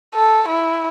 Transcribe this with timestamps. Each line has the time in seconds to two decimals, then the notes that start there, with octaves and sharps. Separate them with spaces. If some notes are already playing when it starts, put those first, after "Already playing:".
0.15 A4
0.48 E4